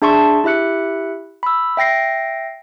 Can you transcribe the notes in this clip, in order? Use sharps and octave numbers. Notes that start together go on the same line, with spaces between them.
D4 G#4 E5 A5 C6 C#6
E4 G4 E5 F#6 C#7
B5 E6
E5 G5 A#6 C7